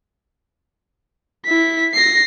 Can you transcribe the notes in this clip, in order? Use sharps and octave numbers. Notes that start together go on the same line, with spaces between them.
E4 B6
A#6 C7